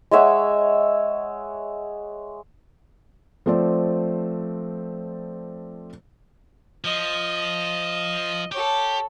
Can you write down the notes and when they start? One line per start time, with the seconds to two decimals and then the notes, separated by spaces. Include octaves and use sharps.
0.11 G#3 C#5 E5 F#5
3.46 F3 A3 C4 C5 D5
6.84 F3 D#5
8.52 G4 A4 C#5